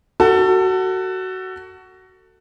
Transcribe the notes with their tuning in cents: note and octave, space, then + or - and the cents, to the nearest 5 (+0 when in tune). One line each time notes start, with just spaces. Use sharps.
F#4 +15 A4 +25